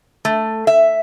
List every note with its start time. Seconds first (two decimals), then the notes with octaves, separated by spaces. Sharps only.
0.25 A3
0.67 E5